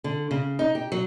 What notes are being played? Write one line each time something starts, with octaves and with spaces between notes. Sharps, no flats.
D3
C#3
D#4
G4
F#3